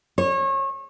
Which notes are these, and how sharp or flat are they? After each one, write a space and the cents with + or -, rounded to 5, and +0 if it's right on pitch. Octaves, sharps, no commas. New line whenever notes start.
C#5 -30